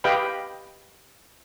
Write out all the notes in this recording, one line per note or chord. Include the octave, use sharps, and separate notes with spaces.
G4 B4 D#5 F5 G5 B5